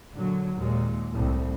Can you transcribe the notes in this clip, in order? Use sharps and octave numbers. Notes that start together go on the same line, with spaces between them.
A#2 D3 F#3
D#2 A#2 G#3
C2 A2